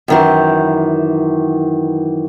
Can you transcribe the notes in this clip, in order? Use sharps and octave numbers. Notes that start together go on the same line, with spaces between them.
F#2 D#3 E3